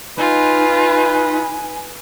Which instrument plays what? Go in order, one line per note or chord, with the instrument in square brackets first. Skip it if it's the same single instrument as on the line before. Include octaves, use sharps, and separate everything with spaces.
[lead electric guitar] D#4 [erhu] F4 [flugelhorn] B4 [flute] G#5